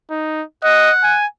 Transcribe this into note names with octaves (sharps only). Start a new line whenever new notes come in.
D#4
D#5 F#5
G#5